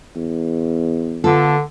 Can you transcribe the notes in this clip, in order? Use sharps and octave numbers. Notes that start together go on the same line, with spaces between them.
E2
D3 B3 F4 A4